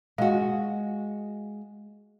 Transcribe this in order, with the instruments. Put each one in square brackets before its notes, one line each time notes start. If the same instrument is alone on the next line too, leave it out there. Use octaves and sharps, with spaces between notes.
[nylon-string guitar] G#3 F#4 [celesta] F5